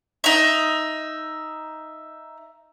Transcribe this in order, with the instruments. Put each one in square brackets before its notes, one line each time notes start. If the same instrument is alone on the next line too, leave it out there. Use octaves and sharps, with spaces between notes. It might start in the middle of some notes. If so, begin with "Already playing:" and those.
[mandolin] D#4 E5